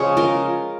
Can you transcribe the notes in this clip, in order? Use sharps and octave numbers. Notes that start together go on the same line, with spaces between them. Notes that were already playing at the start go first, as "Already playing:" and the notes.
Already playing: C#3 F3 G#3 G#4 C#5
F4 A#4